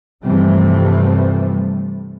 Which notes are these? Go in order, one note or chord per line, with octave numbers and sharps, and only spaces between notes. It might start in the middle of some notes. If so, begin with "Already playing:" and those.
G2 C3 E3 F3 G3 A3